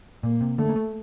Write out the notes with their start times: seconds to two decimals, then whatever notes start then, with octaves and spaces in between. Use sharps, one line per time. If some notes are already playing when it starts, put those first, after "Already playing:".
0.23 A#2 A#3
0.41 C3
0.58 D3 A3
0.69 A#3
0.76 A3